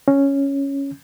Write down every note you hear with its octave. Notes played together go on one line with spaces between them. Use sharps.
C#4